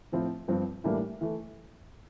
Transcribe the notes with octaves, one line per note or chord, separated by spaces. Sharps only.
A2 F3 C4 E4
G2 F3 C4
A2 E3 G3 A#3 D4
E3 A3